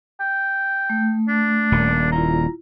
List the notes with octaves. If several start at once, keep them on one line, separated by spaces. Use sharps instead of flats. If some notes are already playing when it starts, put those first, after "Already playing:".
G5
A3
D4
D#1 A#2
E4 F4 A#5